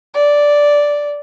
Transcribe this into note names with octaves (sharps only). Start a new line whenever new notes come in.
D5